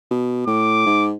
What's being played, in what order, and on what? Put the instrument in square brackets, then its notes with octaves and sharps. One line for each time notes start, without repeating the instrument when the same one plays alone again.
[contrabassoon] B2
[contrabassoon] A2 [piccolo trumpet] D6
[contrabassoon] G#2